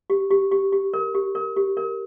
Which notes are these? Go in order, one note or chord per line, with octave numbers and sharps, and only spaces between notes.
G4
G4
G4
G4
A#4
G4
A#4
G4
A#4